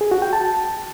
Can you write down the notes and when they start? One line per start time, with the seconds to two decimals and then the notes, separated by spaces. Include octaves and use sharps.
0.01 G#4
0.11 F#4
0.22 G5
0.33 A5